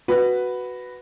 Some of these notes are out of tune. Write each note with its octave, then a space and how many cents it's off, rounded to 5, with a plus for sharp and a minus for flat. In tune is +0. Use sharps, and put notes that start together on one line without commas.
F#4 +0 B4 +0